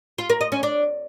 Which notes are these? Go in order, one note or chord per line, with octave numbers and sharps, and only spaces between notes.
F4
A#4
D#5
C#4
D4